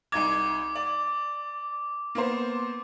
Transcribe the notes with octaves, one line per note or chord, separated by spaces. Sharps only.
C2 D#4 D6 G#6
D5
A#3 B3 C5